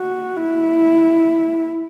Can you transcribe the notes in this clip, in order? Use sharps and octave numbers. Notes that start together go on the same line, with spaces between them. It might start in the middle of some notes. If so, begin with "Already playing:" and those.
Already playing: F#4
E4